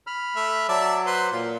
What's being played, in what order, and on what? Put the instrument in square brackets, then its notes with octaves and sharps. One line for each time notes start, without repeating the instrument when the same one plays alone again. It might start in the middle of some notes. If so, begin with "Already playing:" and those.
[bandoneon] B5 F6
[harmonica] A3 E5
[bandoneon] F#3 [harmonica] D5 E5 A5
[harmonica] B4 C5 C6
[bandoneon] A#2 [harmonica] F4